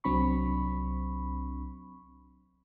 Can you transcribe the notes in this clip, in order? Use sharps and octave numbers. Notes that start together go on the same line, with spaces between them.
C2 F#3 C4 D4 B5 C#6